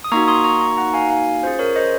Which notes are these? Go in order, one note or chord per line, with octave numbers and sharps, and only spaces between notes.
D#6
A#3 D#4 F#4 A#5 C#6
C6 D#6
A#5 C#6
A#5 C#6
F#5 A#5
F5 G#5
F5 G#5
C#4 F4 G#4 C5
A#4 C#5
C5 D#5